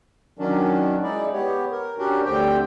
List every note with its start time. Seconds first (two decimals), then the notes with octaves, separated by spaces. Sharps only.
0.39 D#3 F#3 C#4 D4
1.03 G#3 D#4 E4 D5
1.33 B3 G4 C#5
1.72 A#4
1.98 C#4 D4 F#4 G4 A#4
2.25 D2 D3 C4 G4 G5